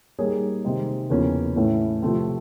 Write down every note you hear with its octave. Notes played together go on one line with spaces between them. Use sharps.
G3 A#3 D#4 G#4 C#5
C3 D#3 G#3 C4 D#4
E2 C#3 F3 A#3 C#4
A2 E3 A3 C#4 E4
C3 F3 A3 C4